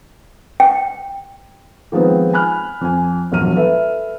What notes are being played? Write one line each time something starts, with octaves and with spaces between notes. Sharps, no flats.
G5
D#3 F3 G#3 B3 C4
G#5 B5 F6 F#6
F2 G#5
E1 A#1 F#3 F6 D#7
A4 B4 E5